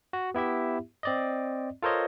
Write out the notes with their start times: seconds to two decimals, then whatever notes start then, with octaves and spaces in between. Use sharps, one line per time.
0.13 F#4
0.34 B3 E4 G4 E5
1.03 C4 D5 D#5
1.82 F4 A4 A#4 C5 C#5 D#5